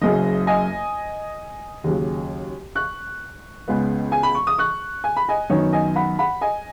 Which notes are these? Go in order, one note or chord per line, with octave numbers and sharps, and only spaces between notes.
F#1 F#2 C#3 D#5
D#5 G#5
D#2 C#3 F#3
C#6 F#6
C#2 C#3 G#3 B3
G#5
B5
C#6
D#6
C#6 F#6
G#5
B5
D#5 G#5
F#2 D#3 B3 C#5
D#5 G#5
F#5 B5
F#5 B5
D#5 G#5